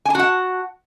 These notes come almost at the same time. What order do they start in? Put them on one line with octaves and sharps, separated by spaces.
G#5 A5 F#4 F#5